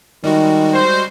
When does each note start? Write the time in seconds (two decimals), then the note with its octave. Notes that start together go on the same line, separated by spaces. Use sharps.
0.24 D#3 G3 G#3 F#4
0.73 C5